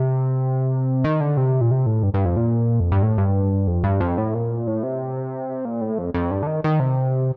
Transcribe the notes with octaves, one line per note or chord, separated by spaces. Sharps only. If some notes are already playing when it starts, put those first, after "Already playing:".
Already playing: C3
D#3
D3
C3
A#2
C3
A2
G2
G2
F2
A#2
F2
G2
A2
G2
F2
G2
F2
A2
A#2
A2
C3
A#2
A2
F2
F2
G2
D3
D#3
D#3
C3